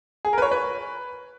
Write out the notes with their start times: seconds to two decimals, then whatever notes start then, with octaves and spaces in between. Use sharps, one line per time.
0.25 G#4
0.33 A#4
0.38 B4
0.42 C#5
0.52 B4